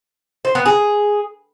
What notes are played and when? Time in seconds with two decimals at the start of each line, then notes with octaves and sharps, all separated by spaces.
0.45 C5
0.55 B3
0.66 G#4